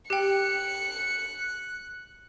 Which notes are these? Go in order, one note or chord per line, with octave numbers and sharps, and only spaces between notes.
G4 G5 F#6 C#7